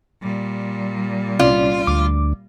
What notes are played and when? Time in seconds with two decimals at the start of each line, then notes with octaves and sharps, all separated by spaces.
0.22 A#2 G3
1.39 C2 C#4 F4 D5
1.87 D2 D6